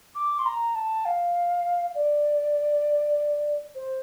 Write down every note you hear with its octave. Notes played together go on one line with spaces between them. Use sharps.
D6
C6
A#5
A5
F5
D5
C5